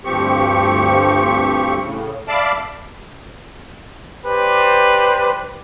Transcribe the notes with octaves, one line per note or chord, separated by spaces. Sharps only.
D2 G2 F3 C4 G4 C#6
A2 C#3
D5 E5 F5 A5 B5 D6
G4 B4 C5 D5